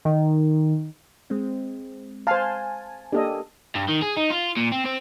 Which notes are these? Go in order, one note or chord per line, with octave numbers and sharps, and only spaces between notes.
D#3
G#3 C4
C5 F5 G#5 A5
A#3 D4 G4 A4 D#5
G2
D#3
G#4
D#4
F4
A#2
C4
C4